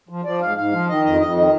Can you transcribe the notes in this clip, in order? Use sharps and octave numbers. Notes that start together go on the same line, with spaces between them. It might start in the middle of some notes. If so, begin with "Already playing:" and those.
F3
F3 D5
G#2 F5
G#2 F5
F3
D#3 D#5
F2 D#5
F2 D#5
D#3 D#5